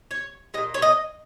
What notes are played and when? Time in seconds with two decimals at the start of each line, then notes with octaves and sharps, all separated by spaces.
0.11 C#5
0.54 A#2 G#3 D#5
0.74 C#5
0.82 D#5